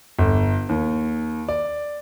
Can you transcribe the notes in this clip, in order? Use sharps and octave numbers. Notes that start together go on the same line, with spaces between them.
G1
D#2
D5